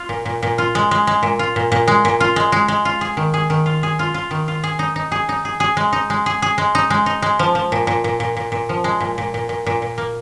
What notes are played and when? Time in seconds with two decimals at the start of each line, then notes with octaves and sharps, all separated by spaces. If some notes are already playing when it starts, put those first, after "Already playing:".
Already playing: F4
0.09 A#2
0.26 A#2
0.43 A#2
0.58 F4
0.75 G#3
0.91 G#3
1.07 G#3
1.23 A#2
1.39 F4
1.56 A#2
1.72 A#2
1.88 G#3
2.05 A#2
2.20 F4
2.36 G#3
2.52 G#3
2.68 G#3
2.85 F4
3.01 G#4
3.17 D#3
3.34 G#4
3.50 D#3
3.66 F4
3.83 G#4
3.99 F4
4.14 F4
4.31 D#3
4.48 F4
4.64 G#4
4.79 D#4
4.96 D#4
5.12 G#4
5.29 D#4
5.45 G#4
5.60 G#4
5.77 G#3
5.93 D#4
6.10 G#3
6.26 G#4
6.42 G#4
6.58 G#3
6.75 D#4
6.90 G#3
7.06 D#4
7.22 G#3
7.39 F3
7.55 F3
7.72 A#2
7.87 A#2
8.04 A#2
8.20 A#2
8.37 A#2
8.52 A#2
8.69 F3
8.84 G#3
9.00 A#2
9.18 A#2
9.34 A#2
9.49 A#2
9.66 A#2
9.82 A#2
9.98 A#3